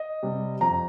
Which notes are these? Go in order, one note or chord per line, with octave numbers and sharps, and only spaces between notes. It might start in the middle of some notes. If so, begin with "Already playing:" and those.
Already playing: D#5
C3 G3
F2 A#5